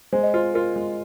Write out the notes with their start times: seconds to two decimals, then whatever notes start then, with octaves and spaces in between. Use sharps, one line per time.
0.13 G#3 C5
0.23 D#5
0.34 F4 C5
0.54 F4 A#4
0.76 G#3